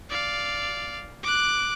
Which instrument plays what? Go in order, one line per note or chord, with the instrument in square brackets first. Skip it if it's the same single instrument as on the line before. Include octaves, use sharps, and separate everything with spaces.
[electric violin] D5 F5
D6 F#6